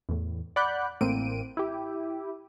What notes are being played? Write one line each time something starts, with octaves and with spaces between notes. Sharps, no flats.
E2 A2
D5 F#5 B5 F#6 G6
A1 A2 A#3 C4 D7 D#7
E4 G4